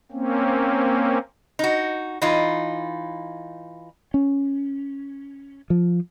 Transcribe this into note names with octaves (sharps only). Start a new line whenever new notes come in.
A#3 C4 C#4
D#4 F#4
E3 D#4 F4
C#4
F3